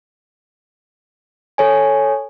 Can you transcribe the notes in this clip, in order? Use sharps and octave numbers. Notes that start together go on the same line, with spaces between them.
A4 C#5 G#5